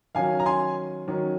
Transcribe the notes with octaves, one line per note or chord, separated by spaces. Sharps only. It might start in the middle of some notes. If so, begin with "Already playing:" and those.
D#3 F#3 C#4 F5 G#5
A#5
G#5 C6
D#3 F#3 C#4